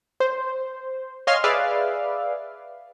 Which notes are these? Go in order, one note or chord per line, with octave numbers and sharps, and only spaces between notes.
C5
C#5 D#5 F5 G#5 C6 F6
G#4 B4 D5 E5 F5